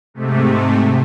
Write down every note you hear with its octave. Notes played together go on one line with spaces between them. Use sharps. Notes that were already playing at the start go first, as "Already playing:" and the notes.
G#2 C3 A3